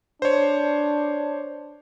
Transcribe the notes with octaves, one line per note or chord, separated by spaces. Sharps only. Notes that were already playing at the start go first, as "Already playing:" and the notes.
D4 C5 C#5